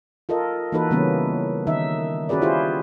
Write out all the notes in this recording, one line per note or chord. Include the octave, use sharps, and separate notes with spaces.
F4 A4 A#4 D#5
E3 A#3 D#4 F#4 A4 B4
C#3 E3 G3 A#3 B3 C#4
D#3 D#4 E5
C#4 F#4 G#4 B4 D5
C#4 E4 F4 G4 G#4 C5